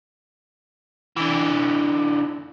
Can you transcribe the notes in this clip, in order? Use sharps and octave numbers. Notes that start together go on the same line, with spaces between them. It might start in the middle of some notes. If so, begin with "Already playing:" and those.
D3 E3